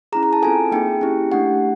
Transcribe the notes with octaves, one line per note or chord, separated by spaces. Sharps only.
C#4 E4 G#4 A#5
A#5
A5
C4 F4 A4 G#5
A#3 D#4 G#4 G5
C#4 E4 G4
A3 D4 G4 F#5